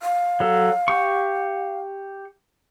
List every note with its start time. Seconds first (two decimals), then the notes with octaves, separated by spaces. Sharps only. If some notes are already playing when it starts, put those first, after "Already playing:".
0.01 F5
0.40 F#3 A4
0.88 G4 C#6